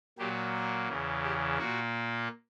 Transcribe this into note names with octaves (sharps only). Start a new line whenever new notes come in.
A#2 F#3 A#3 G4
A#4
E2 C#3 E3
G4
A#2 A#3 F#4